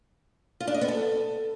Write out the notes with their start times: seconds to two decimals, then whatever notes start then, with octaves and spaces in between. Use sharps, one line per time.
0.60 F4
0.67 D4
0.74 D#5
0.81 B3
0.88 A4